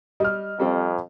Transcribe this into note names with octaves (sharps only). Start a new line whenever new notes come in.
G3 D#5 F6
F2 G3 C4 A4